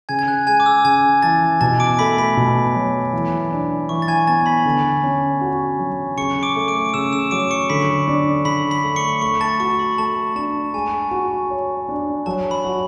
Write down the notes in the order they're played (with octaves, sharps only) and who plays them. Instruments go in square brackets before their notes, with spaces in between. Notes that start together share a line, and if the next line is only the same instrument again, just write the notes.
[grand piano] C#3 [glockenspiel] G#5 G#6
[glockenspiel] G#6
F#6
[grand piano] G#3 [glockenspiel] G#5 G#6
[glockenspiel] D6
E6
[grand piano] C#3 [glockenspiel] G#5 G#6
[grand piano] E3 [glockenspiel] A5 A6
[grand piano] B2 [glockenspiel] A5 A6
[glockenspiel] D6 D7
[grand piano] A3 [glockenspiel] B5 B6
[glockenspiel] B5 B6
[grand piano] B2
F#3
E3
D4
[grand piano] E3 [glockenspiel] C#6
[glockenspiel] A6
G#5 G#6
[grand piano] B3 [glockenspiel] A5 A6
[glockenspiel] B5 B6
[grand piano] D3
C#4
F#4
F#3
[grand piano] C#3 [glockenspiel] C#6 C#7
[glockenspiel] D6 D7
[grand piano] A3
[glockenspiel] D6 D7
D7
[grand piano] C#3 [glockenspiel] E6 E7
[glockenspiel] E6 E7
[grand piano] F#3 [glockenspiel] D6 D7
[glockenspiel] C#6 C#7
[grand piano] D3 [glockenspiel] B5 B6
[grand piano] D4
[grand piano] D3 [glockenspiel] B5 B6
[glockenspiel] B5 B6
[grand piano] A3
[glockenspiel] C#6 C#7
[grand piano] A3 [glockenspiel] C#6 C#7
[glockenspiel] A5 A6
[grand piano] F#4 [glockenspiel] C#6
[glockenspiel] B5
[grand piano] A3 [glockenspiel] A5
[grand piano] D4 [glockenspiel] A5
[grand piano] G#3 [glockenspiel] G#5
[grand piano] F#4
C#5
D4
[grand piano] F#3 [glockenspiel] A5
[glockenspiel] B5
[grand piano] F#4